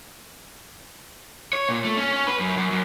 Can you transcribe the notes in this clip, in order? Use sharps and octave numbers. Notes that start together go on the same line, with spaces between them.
C#5
A#2
A3
C#4
C#4
B4
F#2
F#2
F#2